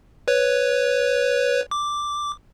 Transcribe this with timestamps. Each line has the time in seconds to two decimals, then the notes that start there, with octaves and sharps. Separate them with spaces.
0.28 B4 C#5
1.71 D6